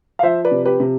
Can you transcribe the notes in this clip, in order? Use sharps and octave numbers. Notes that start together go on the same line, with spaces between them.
F5
F3 C5 E5
B4 D5
C3
G4 B4
C3